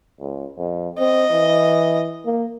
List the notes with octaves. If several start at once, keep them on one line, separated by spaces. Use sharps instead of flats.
C#2
F2
C4 D#5
E3
A#3